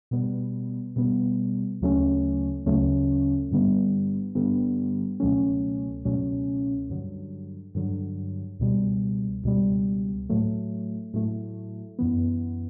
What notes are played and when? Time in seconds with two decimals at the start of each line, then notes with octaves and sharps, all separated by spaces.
0.11 B2 G3 B3
0.96 B2 G3 B3
1.81 D2 C#3 F#3 A3 C#4
2.66 D2 C#3 F#3 A3 C#4
3.51 G2 D3 G3 B3
4.35 G2 D3 G3 B3
5.20 C#2 B2 F#3 A3 C#4
6.05 C#2 B2 F#3 A3 C#4
6.89 G2 D3 F#3
7.75 G2 D3 F#3
8.59 C#2 B2 G3
9.44 C#2 B2 G3
10.29 A2 F#3 A3
11.14 A2 F#3 A3
11.99 F#2 E3 B3